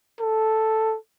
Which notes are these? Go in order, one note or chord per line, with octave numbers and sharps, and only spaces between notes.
A4